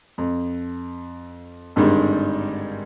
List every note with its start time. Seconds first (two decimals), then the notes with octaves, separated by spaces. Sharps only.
0.18 F2
1.76 G#1 G2 D3 D#3 G3 G#3